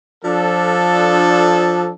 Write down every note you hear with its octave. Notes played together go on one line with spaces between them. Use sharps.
F3 D4 A4